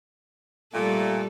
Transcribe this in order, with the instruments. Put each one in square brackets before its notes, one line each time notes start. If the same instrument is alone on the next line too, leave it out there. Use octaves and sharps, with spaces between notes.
[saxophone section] A#2 A3 [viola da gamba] G3 A4